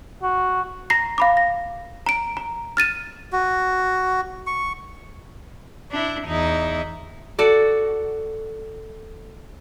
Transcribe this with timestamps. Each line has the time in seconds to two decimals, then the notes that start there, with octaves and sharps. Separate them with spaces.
0.23 F#4
0.90 A#5 A#6 C7
1.18 F5 B5 D6
1.37 A#6
2.06 A#5 D7
2.37 A#5
2.77 F6 A6 D#7 E7
3.33 F#4
4.47 C#6
5.91 D4 E4
6.26 E2 D#4 E4
7.39 F#4 A4 D5